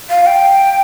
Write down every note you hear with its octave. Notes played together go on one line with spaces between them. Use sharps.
F5
G5